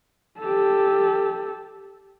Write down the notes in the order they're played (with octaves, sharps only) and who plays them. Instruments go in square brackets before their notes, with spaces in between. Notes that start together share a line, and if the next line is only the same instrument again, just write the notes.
[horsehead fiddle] G4 A4